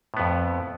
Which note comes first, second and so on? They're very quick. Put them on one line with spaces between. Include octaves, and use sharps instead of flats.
A2 B3 F2